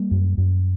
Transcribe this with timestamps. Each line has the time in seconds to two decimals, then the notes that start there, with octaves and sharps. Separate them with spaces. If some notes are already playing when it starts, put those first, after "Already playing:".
Already playing: G3 A#3
0.11 F#2
0.38 F#2